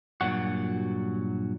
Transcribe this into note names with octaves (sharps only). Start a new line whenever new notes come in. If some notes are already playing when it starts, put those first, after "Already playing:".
G2 A#2 F#3 F#4